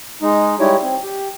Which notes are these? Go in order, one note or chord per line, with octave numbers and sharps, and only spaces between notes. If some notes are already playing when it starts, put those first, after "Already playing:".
G#3 D#4
G3 G#3 D#4 E4 G4 C#5
C4
G4